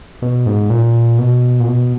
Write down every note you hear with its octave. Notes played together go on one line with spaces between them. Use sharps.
B2
G#2
A#2
B2
A#2
B2